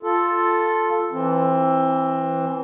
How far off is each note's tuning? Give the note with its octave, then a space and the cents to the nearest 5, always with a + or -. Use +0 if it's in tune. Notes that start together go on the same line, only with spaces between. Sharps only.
F4 +0 A4 +0
E3 +0 C4 +20